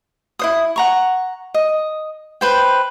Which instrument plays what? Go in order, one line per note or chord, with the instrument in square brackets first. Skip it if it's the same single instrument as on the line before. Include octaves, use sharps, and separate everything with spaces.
[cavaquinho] E4 C5 D#6
F#5 A#5 C#6
D#5
B4 C5 G5